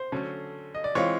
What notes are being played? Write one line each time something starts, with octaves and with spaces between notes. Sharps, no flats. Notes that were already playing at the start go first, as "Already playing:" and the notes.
Already playing: C5
D3 F#3 A3 C#4
D#5
D5
E3 G#3 C4 F4 C#5